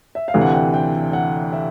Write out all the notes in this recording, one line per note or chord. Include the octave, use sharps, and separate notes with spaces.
E5
F5
D2 C3 E3
F#5
G5
G5
F#5
E5